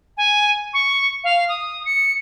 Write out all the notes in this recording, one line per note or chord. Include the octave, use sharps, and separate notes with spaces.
G#5
C#6
F5
D#6
C#7